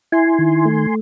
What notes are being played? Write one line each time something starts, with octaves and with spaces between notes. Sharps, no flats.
E4 G#5 C6
D#3
A3